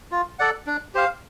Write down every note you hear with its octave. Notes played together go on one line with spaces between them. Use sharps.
F4
A4 D5 F#5
D4
G4 C5 F5